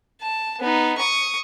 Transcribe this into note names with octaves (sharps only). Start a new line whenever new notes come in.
A5
B3 D#4
C#6 D#6